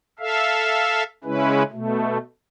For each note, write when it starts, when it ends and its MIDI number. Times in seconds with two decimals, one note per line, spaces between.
0.19 1.03 69
0.19 1.03 76
0.19 1.03 77
1.24 1.63 49
1.24 1.63 56
1.24 1.63 61
1.24 1.63 64
1.24 1.63 71
1.72 2.18 47
1.72 2.18 57